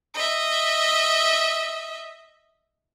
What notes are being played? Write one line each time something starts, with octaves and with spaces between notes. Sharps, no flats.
D#5 E5